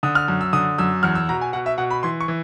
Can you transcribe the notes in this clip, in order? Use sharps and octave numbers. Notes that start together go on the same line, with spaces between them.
D3 D#6
F6
F#2
E6
D3 D#6
F#2 E6
E2 F6
E6
B2 A#5
G#5
B2 F#5
E5
B2 F#5
B5
E3 C6
C#6
E3